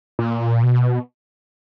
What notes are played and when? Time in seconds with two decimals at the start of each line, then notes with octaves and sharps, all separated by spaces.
0.19 A#2
0.63 B2